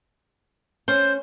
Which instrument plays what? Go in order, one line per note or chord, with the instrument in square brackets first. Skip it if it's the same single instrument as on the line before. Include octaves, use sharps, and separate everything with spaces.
[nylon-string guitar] C#4 [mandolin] C5